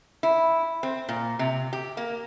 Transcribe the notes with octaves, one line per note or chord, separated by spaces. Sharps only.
E4
C4
A#2
C3
G4
A#3